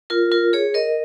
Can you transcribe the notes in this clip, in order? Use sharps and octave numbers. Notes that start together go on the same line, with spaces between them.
F4 A#4
F4 A#4
G#4 C#5
A#4 D#5